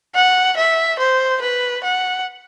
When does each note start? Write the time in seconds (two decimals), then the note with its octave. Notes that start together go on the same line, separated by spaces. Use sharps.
0.15 F#5
0.57 E5
0.99 C5
1.42 B4
1.84 F#5